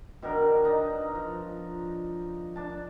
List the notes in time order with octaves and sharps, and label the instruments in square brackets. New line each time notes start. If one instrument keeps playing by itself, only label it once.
[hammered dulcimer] B2 D#3 D4 A#4
D4 D#4
F3
D4 A5